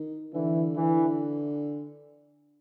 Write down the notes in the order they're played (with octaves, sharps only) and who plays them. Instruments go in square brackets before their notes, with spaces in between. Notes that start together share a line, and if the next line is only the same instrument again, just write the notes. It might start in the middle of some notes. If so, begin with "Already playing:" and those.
Already playing: [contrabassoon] D#3
[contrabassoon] D3 [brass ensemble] E3
[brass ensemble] E3